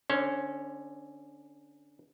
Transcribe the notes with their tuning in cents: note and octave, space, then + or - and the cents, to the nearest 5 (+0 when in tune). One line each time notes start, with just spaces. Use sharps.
D3 +0 C#4 +0 C5 +40